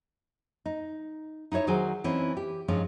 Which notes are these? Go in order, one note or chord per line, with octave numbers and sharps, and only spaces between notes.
D#4
D#4 E4 B4 C#5 E5
D#3 F#3 G#4 C5 G#5
E3 C4 C#4 D#4 E4
G4
G2 F3 G#3 C#4 D#4 F4